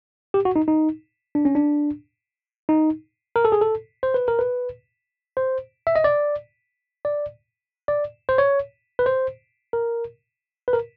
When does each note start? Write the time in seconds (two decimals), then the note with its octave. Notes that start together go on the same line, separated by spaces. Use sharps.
0.34 G4
0.45 F#4
0.56 D#4
0.68 D#4
1.35 D4
1.45 C#4
1.55 D4
2.69 D#4
3.36 A#4
3.45 A4
3.52 G#4
3.61 A4
4.03 C5
4.14 B4
4.28 A#4
4.39 B4
5.37 C5
5.87 E5
5.96 D#5
6.04 D5
7.05 D5
7.88 D5
8.29 C5
8.38 C#5
8.99 B4
9.06 C5
9.73 A#4
10.68 B4
10.73 A#4